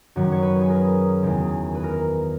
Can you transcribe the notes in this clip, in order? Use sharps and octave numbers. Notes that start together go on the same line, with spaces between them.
F#2 D#3 F#3 F#4
C#5
B4
G#4
A#4
E2 D#3 G#3
B4
A#4